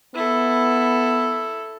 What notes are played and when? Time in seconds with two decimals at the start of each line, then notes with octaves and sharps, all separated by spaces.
0.14 B3 E4 A4